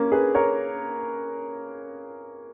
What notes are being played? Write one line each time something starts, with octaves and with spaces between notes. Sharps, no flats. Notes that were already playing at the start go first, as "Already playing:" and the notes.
Already playing: A#3 C#4
G#4 B4
A#4 C#5